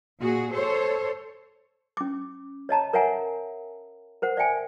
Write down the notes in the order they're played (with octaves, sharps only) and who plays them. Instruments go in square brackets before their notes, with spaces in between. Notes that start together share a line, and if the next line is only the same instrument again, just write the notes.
[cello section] A#2 F#4 G#4
A4 C5 C#5
[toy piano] C#4 D6
C#5 D#5 A5 A#5
A#4 C#5 E5 F#5 G#5 A#5
A#4 C5 F#5
D5 E5 G5 G#5